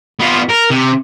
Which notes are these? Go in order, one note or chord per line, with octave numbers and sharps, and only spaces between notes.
B3 F4
A#4
C3